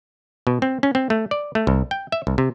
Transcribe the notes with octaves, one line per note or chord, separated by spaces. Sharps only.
B2
C4
C#4
C4
A3
D5
A3
C2
G5
E5
C2
C3